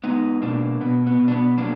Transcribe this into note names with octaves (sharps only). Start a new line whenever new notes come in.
G#3 B3 D#4
B2 A#3 D4
B2 B3
B3
B2
D4
B3
F#3 A#3 D4